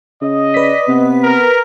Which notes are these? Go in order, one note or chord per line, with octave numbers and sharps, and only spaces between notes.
C#3 D#5
B4 D5 B6
C3 B3
A#4